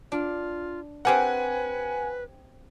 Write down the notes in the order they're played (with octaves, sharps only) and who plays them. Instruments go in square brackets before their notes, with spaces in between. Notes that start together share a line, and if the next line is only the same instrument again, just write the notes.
[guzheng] D4 [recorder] F4
[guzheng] C4 G4 A#4 [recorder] B4 [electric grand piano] F#5 G#5